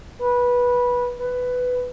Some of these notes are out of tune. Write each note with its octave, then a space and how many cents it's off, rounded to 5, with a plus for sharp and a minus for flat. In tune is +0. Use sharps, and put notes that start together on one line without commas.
B4 -15
B4 +10